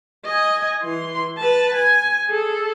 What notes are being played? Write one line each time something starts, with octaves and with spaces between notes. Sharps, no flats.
D#5 G#5
E3 C6
B4 A5
G#5
G#4 A4